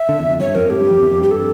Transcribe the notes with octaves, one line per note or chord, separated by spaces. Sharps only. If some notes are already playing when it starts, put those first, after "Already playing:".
Already playing: E5
D3
E2
F2
G2 C#5
F2 A#4
G2
A2 G4
G2
F2
E2
F2
G2 G4
A4